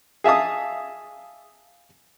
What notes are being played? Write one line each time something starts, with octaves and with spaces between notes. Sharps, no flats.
G#4 E5 F5 A5 D#6